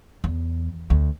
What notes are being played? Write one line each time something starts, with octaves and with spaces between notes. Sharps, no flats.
E2
D2